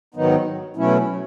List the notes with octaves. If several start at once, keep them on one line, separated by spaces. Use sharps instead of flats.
G#2 D#3 F#3 B3 D#4
B2 F#3 A3 C#4 E4